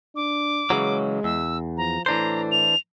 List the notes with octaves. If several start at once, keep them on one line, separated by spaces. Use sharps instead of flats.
D4 D6
C#3 E3 F#3 G#3
E2 E6
F3 A#5
A2 E3 D4 C5 A#5
F7